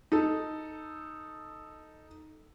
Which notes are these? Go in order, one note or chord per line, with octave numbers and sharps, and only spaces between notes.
D#4 A4